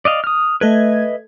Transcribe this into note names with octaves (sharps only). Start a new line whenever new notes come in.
D5 D#5 F5
D#6 F6
A3 A4 B4 D#5 E5 G#6